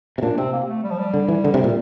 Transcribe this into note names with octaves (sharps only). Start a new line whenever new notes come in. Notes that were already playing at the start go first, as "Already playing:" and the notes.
C3
A#2 D4
C3 C4
A#3
A3
G3
F3
G3
D3
E3
D3
C3
A#2